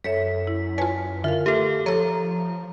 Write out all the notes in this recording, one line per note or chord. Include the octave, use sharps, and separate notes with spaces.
F#2 A4 C#5 E5 B6
E4
F4 B4 C#5 G#5 A5
D3 F4 A#4 E5 F5
A3 G4 A4 E5 F6
F3 A4 C#5 A#5